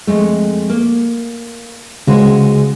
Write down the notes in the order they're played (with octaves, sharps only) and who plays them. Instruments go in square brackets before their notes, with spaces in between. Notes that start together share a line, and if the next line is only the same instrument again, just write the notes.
[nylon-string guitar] F2 G#3 A3
A#3
[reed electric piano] C#3 [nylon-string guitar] G#3 F#4 C5